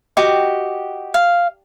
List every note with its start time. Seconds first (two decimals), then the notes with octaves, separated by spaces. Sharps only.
0.17 F#4 G4 D#5 D6
1.14 F5